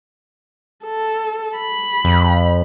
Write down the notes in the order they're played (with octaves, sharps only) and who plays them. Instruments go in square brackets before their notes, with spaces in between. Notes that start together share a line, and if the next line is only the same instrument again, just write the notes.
[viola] A4
B5
[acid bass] F2